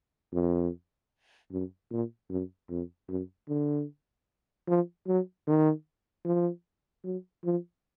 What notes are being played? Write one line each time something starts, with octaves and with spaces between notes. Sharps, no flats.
F2
F#2
A#2
F#2
F2
F#2
D3
F3
F#3
D#3
F3
F#3
F3